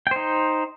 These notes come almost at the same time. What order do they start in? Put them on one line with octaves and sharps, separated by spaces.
G5 C5 D#4